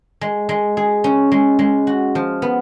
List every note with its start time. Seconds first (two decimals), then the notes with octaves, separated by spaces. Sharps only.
0.21 G#3
0.49 G#3
0.77 G#4
1.04 C#4
1.32 G#3
1.59 G#3
1.87 F#4
2.15 F3
2.42 B3